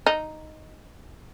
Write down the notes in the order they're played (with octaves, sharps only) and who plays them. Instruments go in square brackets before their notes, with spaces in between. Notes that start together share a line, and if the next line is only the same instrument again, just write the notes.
[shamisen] D#4